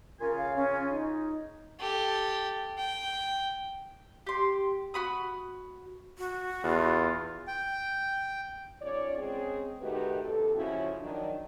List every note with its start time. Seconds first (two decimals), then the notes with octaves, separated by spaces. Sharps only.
0.21 C#3 F4 A#4 G#5
0.38 F5
0.56 C#4
0.90 D#4
1.79 G4 A4
2.78 G5
4.26 G4 C6
4.94 F#4 B5 D#6
6.18 F#4
6.64 E2 F4
7.48 G5
8.81 G#2 C#4 F4 C#5 D5
9.18 G#3 C4 C#4 G#4
9.81 D#3 A3 D#4 F#4 G4 B4
10.22 D#2 C3 G4 A4
10.55 C#3 F3 C#4 E4 F#4
11.01 D#3 F3 F#3 D4